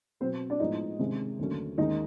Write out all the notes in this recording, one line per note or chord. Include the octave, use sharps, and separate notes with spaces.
B2 F#3 B3 C4 C5
D4 D5
A2 F3 G#3 B3 D#4 D#5
C3 D#3 G#3 C#4
D#2 D3 F#3 A3 C#4
D#2 D#3 G#3 C#4 D#4 D#5